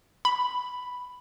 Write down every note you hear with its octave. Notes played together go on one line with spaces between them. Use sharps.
B5